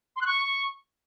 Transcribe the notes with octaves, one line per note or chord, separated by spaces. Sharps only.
C6
F#6
C#6